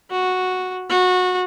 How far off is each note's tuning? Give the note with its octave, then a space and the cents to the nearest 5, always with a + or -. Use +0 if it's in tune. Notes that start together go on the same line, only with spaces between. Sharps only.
F#4 -5
F#4 -20